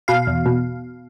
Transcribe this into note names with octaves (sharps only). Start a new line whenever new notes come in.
B2 F5
E2
B2